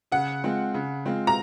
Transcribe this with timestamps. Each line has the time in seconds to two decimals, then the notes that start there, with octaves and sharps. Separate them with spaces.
0.12 C#3 F#5
0.44 G#3 C4 F4
0.74 C#3
1.05 G#3 C4 F4
1.27 A#5